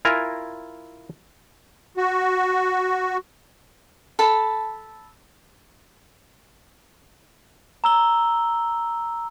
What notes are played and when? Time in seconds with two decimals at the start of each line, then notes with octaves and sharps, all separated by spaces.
0.05 E4 F4 A#4 G#5 A#5
1.97 F#4
4.19 A4 A5 B5
7.84 A#5 E6 G7